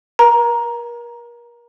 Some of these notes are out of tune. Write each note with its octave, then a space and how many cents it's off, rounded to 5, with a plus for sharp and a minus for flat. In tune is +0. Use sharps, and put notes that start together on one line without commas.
A#4 +35 A#5 +10